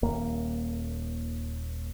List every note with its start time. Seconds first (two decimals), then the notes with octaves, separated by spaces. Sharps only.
0.03 D#1 A#3